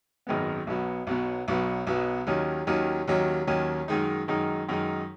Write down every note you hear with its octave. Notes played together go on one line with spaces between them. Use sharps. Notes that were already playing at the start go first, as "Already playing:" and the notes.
G#1 F#2 D#3 G#3 B3
B1 B2 F#3 B3
B1 B2 F#3 B3
B1 B2 F#3 B3
B1 B2 F#3 B3
D#2 D#3 F#3 C#4
D#2 D#3 F#3 C#4
D#2 D#3 F#3 C#4
D#2 D#3 F#3 C#4
F#2 D#3 G#3 D#4
F#2 D#3 G#3 D#4
F#2 D#3 G#3 D#4